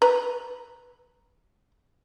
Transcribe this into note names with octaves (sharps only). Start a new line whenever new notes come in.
B4 A#5